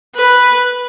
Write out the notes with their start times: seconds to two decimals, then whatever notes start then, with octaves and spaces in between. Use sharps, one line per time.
0.15 B4